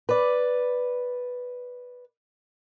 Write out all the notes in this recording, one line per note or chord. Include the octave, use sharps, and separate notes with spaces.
B4 D5